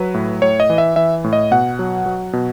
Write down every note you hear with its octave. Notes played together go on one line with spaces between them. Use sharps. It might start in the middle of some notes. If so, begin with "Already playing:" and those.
Already playing: F#3 B4
A2
A2 C#5
D#5
E3
E5
E3 E5
A2
D#5
B2 F#5
F#3
F#3
B2